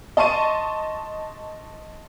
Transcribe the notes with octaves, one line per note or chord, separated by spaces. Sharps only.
D#5 A5 C6 C#6 D#7